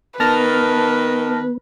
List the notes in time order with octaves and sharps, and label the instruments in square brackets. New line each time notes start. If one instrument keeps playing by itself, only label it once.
[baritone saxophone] D#3 [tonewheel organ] B3 [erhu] B4 [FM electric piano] A5 F6 A#6